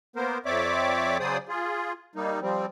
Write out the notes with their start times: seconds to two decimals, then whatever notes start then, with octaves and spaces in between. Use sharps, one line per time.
0.16 A#3 B3 A#4 C5
0.46 F2 C4 C#5 D5 E5 D6
1.20 C#3 F#3 G#4 C5 D5 D#6
1.49 F4 G#4
2.15 G3 A#3 D#4
2.42 F3 G3 C4